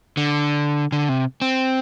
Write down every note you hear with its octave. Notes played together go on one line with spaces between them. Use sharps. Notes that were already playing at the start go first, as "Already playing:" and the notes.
D3
D3
C3
C4